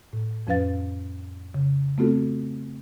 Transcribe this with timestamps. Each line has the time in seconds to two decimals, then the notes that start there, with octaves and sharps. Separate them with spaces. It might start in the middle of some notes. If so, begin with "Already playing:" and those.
0.13 A2
0.47 F2 F3 C#4 B4 F5 A6
1.54 C#3
1.98 A3 B3 C4 F4 F#4 A4